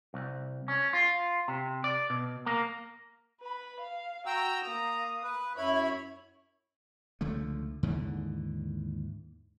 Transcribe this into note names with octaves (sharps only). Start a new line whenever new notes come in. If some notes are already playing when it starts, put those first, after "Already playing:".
C2
C#4
F4
C3
D5
B2
A#3
B4 B5
F5
F#4 G5 A#5 E6
A#3 A#5 D#6
B4
F#2 E4 C#5 B5
C#2 D3 F3 A3
D#2 G#2 D3 E3